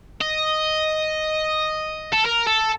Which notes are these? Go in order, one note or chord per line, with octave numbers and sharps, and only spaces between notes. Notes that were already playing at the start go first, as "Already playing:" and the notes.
D#5
A4
A#4
A4